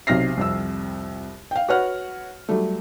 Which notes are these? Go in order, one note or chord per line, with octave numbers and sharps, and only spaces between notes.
B1 C3 F6 A#6 C7
C2 F2 E6
F5 G5
F#4 B4 C#5 F#5 F6
F#3 G3 A3